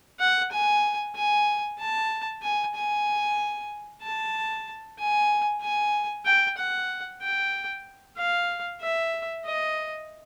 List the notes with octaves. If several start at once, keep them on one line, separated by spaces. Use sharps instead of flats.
F#5
G#5
G#5
A5
G#5
G#5
A5
G#5
G#5
G5
F#5
G5
F5
E5
D#5